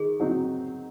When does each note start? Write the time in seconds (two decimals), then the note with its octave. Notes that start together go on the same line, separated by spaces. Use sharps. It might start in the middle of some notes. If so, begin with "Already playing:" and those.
Already playing: D#3 G#4
0.20 F#3 C4 D#4 F#4